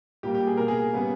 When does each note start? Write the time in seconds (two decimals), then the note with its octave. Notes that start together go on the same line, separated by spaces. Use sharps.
0.23 A#2 G3 A#3 G4
0.34 G4
0.47 G#4
0.57 B2 A#3 A#4
0.68 G#4
0.93 C#3 G3 B3